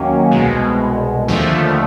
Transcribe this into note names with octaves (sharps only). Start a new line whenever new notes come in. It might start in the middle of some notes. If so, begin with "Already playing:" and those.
Already playing: D#2 D#3 F#3 A#3 C#4
C2 B2 G#3
D#2 D3 F3 A3